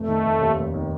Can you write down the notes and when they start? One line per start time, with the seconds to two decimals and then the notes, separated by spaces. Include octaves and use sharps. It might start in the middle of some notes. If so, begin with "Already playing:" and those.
Already playing: F1 A3
0.08 D#3
0.25 F1
0.41 D#2
0.58 F1
0.74 D#3